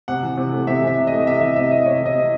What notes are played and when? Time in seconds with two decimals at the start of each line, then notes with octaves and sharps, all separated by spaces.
0.08 C3 F#5
0.23 E3
0.37 C3
0.53 A3
0.67 C3 E5
0.82 E3
0.87 E5
0.97 C3
1.07 D#5
1.12 A3
1.27 C3 E5
1.41 E3 E5
1.56 C3 E5
1.71 A3 D#5
1.86 C3 C#5
2.01 E3 D#5
2.16 C3